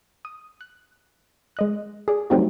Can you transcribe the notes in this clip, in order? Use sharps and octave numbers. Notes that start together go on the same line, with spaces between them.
D#6
F#6
G#3 D#5 F#6
G#4 D5
F#3 G3 A3 C4 D#4 F#4